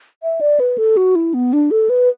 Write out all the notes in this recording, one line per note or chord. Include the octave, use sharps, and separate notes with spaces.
E5
D5
B4
A4
F#4
E4
B3
D4
A4
B4